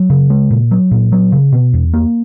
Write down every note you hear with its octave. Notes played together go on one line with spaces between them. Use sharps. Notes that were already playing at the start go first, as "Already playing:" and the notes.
Already playing: F#3
C#3
G#3
A#2
F#3
A#2
F#3
C#3
B2
E2
A#3